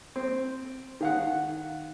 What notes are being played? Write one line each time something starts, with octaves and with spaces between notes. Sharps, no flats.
C4
D#3 F5 F#5